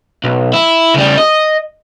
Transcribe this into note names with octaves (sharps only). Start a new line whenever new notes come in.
B1
E4
C#3 G3
D#5